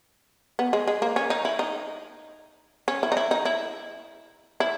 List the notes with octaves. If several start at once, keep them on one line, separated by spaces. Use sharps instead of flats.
B3
G#3
G#3
A#3
C#4
D#4
E4
D#4
C#4
E4
D#4
E4
D#4
E4
E4